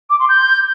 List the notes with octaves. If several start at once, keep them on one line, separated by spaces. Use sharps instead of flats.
D6
C6
G6